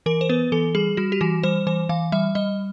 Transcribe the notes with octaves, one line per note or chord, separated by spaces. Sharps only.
E3 A#4
C5
B3 B4
E3 A4
G3 G#4
G3 F#4
G4
E3 F#4
G3 C5
E3 C5
E3 F5
G3 E5
G3 D#5